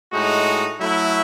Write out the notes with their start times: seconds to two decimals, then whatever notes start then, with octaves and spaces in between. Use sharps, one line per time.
0.12 A2 G#3 D#4 F#4
0.80 F#3 A3 E4